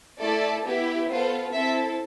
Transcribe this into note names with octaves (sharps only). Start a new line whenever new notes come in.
A3 E4 A4 D5
B3 E4 G4
B3 F4 A4 C5
C4 E4 A4 E5